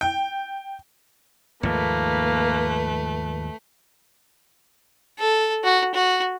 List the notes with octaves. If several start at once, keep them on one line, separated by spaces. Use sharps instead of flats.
G5
D#2 G#2 F3 A3 A#3 B4
A4
F#4
F#4